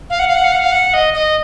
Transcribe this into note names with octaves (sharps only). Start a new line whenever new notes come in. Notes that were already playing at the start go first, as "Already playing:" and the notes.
F5
F#5
F5
F#5
F5
F#5
F5
F#5
D#5
D#5